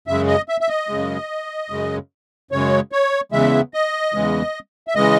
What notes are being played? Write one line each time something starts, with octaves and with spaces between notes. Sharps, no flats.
F#2 C#3 G#3 E5
D#5
E5
E5
D#5
F#2 C#3 G#3
F#2 C#3 G#3
F#2 C#3 G#3 C#5
C#5
E2 C#3 E3 G#3 E5
D#5
E2 C#3 E3 G#3
E5
C#3 E3 G#3 D#5